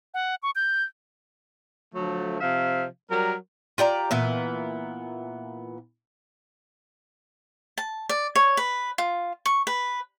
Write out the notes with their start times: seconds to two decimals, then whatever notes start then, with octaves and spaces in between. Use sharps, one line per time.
0.14 F#5
0.43 C#6
0.56 G6
1.93 D3 F3 F#3 A3
2.40 C3 F3 E5 F5
3.08 F#3 G3 A#4
3.78 F4 G4 D5 A#5
4.11 A#2 E3 B3
7.78 A5
8.09 D5
8.36 C#5
8.57 B4
8.98 F4
9.46 C#6
9.67 B4